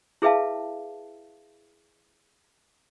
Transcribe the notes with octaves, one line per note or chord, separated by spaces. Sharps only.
E4 G#4 B4 E5 F5 A5